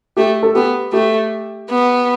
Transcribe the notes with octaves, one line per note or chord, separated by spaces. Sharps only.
A3 G4
A4
B3 G4
A3 G4
B3